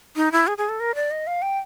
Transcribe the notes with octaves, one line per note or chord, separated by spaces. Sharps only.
D#4
E4
G#4
G#4
A4
A#4
D5
D#5
F5
G5